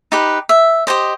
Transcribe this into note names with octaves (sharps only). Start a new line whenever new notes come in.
D#4 G4 B4
E5
G4 C5 D#5